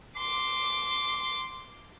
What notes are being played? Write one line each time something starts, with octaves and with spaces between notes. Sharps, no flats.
C6 D6